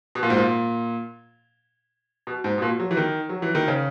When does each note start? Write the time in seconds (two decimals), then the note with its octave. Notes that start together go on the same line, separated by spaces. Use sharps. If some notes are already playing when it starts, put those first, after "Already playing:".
0.15 B2
0.23 A#2
0.30 G#2
0.37 A#2
2.27 B2
2.44 G#2
2.58 B2
2.62 A#2
2.80 F#3
2.91 E3
2.97 D#3
3.29 F#3
3.42 E3
3.55 D#3
3.68 C#3